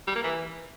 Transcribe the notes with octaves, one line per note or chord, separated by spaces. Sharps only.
G3
A#3
E3